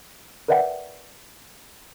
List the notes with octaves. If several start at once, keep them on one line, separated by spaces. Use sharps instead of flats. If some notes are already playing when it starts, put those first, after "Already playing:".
A#4 B4 D5 E5 F#5 G5